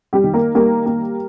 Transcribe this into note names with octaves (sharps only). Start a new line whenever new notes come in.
G3 G4
D#3
A#3 A#4
G3 A#3 A#4
A#3